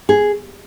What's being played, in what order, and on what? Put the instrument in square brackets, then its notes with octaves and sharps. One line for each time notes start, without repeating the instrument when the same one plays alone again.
[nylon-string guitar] G#4